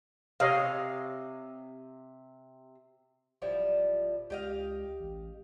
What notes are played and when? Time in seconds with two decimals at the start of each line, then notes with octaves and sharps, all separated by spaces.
0.40 C3 C#5 D#5 F5
3.42 D1 F3 G3 E4
4.30 C#2 G4 D#5 F5
5.00 A1